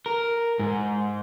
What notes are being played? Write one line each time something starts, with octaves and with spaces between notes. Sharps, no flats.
A#4
G#2